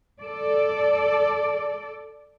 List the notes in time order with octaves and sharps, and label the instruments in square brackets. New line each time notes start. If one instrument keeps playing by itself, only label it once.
[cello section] A4 D5